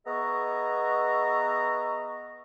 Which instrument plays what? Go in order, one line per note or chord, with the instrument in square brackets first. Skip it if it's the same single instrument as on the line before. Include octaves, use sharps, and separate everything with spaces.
[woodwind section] B3 G#4 D#5 E5 A#5 C#6